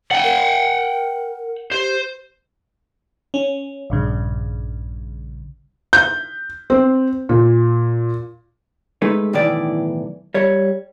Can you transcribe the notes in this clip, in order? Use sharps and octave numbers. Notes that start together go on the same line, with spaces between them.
F#5 G5
A#4
G4 C5
C#4
A#1 G2 C#3
G6
C4
A#2
G#3 A3 D#4 B4
B1 A2 D#3 E3 D5
G3 C#5